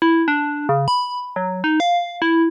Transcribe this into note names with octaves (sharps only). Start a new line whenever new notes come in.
E4
D4
C#3
B5
F#3
D#4
F5
E4